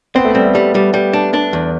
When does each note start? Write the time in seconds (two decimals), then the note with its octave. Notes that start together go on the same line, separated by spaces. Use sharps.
0.15 B3 C4
0.25 A3
0.35 G3 C4
0.45 A3
0.55 G3
0.75 G3
0.94 G3
1.13 D4
1.34 D4
1.53 E2